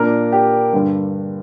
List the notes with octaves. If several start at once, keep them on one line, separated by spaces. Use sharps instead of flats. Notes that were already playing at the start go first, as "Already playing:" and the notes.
Already playing: A#2 A#3 D4 A#4
G4
G2 D3 G3